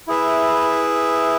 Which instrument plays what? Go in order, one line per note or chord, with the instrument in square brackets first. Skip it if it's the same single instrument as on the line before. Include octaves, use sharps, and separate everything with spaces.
[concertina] E4 G#4 B4 E5